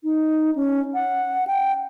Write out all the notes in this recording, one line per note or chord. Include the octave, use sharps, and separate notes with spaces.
D#4
C#4
F#5
G5